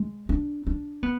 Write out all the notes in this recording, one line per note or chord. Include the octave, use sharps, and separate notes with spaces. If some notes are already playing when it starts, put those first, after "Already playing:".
Already playing: G#3
D4
D4
B3